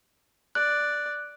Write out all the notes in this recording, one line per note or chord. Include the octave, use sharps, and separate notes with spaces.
D5 F#6